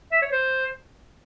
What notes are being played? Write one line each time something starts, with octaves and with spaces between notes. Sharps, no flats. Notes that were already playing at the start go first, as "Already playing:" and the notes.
E5
C#5
C5